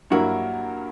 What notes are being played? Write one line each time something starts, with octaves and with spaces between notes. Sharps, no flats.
G2 F#3 A#3 E4 F#4 A#4